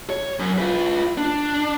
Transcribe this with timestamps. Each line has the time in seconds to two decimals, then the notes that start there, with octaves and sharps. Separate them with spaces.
0.10 C#5
0.39 F#2
0.58 F4 B4
1.18 D4